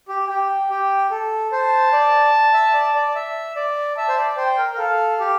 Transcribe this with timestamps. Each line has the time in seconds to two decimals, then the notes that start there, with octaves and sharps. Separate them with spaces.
0.08 G4
0.29 G4 G5
0.70 G4
1.11 A4
1.51 C5 A5
1.93 D5
2.53 E5
2.74 D5
2.95 D5
3.15 E5
3.56 D5
3.96 E5 A5
4.08 C5
4.18 D5
4.37 C5 G5
4.58 A#4
4.74 A#4
4.78 A4 F5
5.20 G4